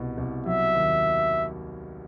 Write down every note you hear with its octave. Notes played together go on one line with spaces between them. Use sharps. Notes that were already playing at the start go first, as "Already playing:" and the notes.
Already playing: C2 B2
C2
F#3 E5
D#2